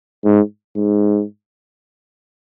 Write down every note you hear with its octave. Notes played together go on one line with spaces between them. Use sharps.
G#2
G#2